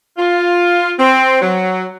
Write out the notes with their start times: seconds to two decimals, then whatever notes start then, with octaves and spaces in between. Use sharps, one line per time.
0.17 F4
0.98 C4
1.41 F#3